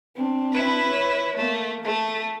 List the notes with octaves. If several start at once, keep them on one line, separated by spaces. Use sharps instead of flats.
C4 D4
E4 B4
C#5
A3 A#3
A3 A4